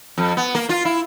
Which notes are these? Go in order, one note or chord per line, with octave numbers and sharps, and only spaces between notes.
F2
B3
A#3
F4
E4